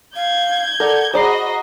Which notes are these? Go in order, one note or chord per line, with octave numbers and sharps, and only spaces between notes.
F5 G6 G#6
A4 A#4 D5 F#5
F#4 G#4 C5 D5 D#5 A#5 B5 C7